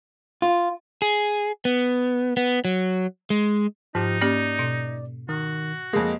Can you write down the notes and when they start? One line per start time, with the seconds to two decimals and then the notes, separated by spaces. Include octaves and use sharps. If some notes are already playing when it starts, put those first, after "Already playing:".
0.42 F4
1.02 G#4
1.65 B3
2.37 B3
2.65 F#3
3.30 G#3
3.95 G#2 F3 D#4 G4
4.21 A#3 C#4 G4 D5
4.59 B2
5.29 D#3 F#4
5.93 F2 G#3 A#3 D#5